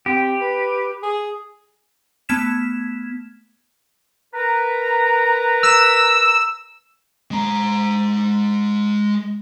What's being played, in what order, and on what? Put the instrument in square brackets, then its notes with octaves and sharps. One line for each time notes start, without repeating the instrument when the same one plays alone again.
[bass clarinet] C4 [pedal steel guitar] G4
[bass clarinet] B4
G#4
[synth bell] A3 B3 F6 G#6 B6 E7
[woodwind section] A#4 B4 A#5
[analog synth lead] E6
[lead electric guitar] G#3 A#5